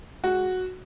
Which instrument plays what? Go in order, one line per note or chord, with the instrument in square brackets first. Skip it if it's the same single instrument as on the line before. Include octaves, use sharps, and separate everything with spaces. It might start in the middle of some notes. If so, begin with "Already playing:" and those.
[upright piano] G#3 F#4